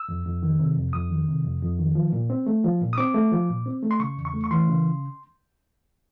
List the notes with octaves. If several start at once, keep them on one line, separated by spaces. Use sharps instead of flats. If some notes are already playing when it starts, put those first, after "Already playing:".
Already playing: E6
F2
F2
D#3
C3
F2
F2 D#6
D#3
C3
F2
F2
D#3
F3
A#2
C4
A3
F3
A#2
D#6
C4 D6
A3
F3
A#2
C4
A3
C6
C#3 C#6
E2
C#6
A3
C#6
E3 C6
C#3